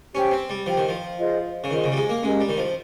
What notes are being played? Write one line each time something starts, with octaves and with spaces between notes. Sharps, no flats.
C#4 G4 C5 G5
C4
G3
F3 G4 C5 G5
D#3
F3
F4 G#4 C5 D#5
C#3
D#3 F4 G#4 C5 D#5
C#3
G3
G#3
A#3
G#3 C#4 G4 A#4 D#5
G3
D#3
F3